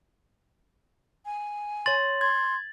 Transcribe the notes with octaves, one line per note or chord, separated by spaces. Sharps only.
G#5
C#5 C6 A6 F#7
C6 G#6